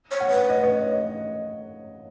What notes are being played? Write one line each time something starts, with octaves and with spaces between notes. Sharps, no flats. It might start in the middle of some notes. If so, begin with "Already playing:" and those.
C#5
F#5
B4
D#5
C#5
C#5
D#5